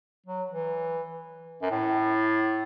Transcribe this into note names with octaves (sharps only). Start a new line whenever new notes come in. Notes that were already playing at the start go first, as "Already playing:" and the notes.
F#3
E3
F#2
A2